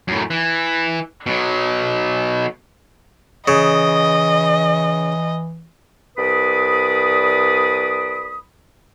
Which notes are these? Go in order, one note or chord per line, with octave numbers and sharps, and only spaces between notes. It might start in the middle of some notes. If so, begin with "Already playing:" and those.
F#2 A2
E3
B2 F#3
C#3 E3 D#5
C2 B4 D5 B5 D#6